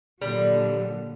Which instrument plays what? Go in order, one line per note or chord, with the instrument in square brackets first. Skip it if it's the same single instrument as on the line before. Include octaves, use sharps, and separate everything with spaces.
[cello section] A#2 D3 F#3 [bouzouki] G3